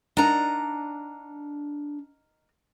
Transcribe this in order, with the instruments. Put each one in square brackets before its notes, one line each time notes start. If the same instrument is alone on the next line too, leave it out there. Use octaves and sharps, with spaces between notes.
[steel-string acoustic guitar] D4 A#5 [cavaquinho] D#4 A#4 F#5